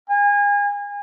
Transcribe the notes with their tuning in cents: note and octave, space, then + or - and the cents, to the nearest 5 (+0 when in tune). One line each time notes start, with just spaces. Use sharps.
G#5 -30